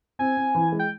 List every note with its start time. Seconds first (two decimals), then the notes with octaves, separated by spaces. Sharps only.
0.19 C4 G#5
0.37 C4
0.55 E3
0.72 G#3
0.79 G5